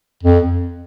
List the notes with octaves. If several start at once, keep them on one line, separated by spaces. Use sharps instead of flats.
F2